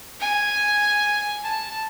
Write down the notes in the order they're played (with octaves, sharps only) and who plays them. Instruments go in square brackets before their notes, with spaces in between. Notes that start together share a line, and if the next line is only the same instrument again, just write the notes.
[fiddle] G#5
A5